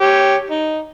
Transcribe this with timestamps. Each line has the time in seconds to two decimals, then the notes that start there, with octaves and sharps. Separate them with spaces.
0.01 G4 C#5
0.50 D#4